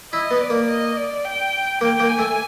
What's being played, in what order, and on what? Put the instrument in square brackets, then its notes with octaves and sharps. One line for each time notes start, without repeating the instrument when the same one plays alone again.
[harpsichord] E4 [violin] D#5
[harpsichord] B3
[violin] D5
[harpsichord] A#3
[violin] D#5
D5
G5
[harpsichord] A#3 [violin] G5
[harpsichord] A#3
[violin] G#5
[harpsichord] A3